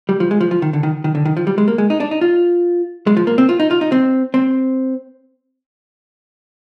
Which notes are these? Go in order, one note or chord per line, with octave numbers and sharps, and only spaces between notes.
G3
F3
G#3
F3
F3
D#3
D3
D#3
D#3
D3
D#3
F3
G3
G#3
A#3
G#3
D#4
D4
D#4
F4
G#3
F3
A#3
C4
F4
D#4
F4
D#4
C4
C4